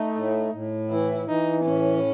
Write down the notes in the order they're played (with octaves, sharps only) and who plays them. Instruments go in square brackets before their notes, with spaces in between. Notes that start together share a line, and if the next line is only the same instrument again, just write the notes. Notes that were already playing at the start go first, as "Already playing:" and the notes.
Already playing: [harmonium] A3 [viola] D#4
[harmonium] A2
A2
[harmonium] E3 [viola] E4
[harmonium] E3 [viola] D#4
[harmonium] A2 [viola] C#4